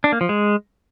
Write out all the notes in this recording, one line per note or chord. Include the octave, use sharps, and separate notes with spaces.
D4
A#3
F3
G#3